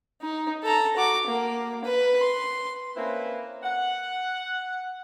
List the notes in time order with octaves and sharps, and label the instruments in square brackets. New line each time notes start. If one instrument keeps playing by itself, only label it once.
[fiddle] D#4
A4 A#5
F#4 D6
A#3
B4
C6
[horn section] A#3 C4 C#4 E4 B4
F#5